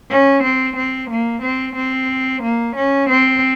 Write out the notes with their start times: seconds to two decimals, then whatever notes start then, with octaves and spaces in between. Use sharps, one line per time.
0.10 C#4
0.43 C4
0.77 C4
1.10 A#3
1.42 C4
1.76 C4
2.43 A#3
2.76 C#4
3.10 C4